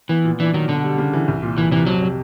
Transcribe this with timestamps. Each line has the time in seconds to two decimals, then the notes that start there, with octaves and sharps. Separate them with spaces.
0.09 E3 B3
0.24 A#2
0.40 E3 D4
0.54 D#3 F#3
0.68 B2 D3
0.83 G3
0.98 C#3
1.13 E3
1.28 C2
1.42 A#2
1.57 C2 E3
1.71 C3 E3
1.87 F2 F#3
2.02 C3